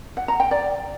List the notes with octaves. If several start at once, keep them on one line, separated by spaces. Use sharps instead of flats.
F#5
A#5
G5
D5